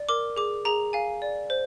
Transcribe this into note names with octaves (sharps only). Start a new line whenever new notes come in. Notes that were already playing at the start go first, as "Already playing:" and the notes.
Already playing: D5
A#4 D6
G#4 D6
G#4 A#5
F5 G#5
D5
C5